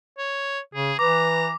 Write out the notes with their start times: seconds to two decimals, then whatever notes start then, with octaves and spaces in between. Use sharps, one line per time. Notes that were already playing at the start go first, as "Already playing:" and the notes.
0.18 C#5
0.74 C#3 G#4
0.99 E3 B4 A#5 D6